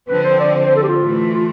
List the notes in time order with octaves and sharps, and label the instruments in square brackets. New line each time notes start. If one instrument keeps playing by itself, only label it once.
[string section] D3 F3 C4 [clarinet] B4
[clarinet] C5
D5
C5
C5
A4
G4
F4
[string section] A2 E3 A3
[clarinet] F4